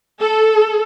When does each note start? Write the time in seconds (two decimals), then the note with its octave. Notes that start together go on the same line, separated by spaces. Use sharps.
0.21 A4